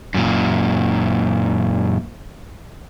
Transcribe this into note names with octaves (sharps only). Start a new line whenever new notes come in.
F#2 A#2